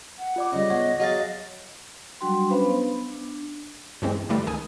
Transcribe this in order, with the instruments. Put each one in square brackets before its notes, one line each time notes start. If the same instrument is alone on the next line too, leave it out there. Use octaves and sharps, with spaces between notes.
[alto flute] F#5
[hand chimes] F4 D5 D6
[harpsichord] C#3 [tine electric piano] G3 C#4 [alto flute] D#5
[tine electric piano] B3 C#5 [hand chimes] F#5
[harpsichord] F#3 G#4 [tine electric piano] F#4 F5 A6
[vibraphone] F#3 G3 D4 F#4 G5 C6
C#4 D4 B4 C5 F5 B5
B3
D4
[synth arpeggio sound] G2 E3 G#3 C4
G2 D3 E3 G3 A3
C#2 D#3 G#5 D#6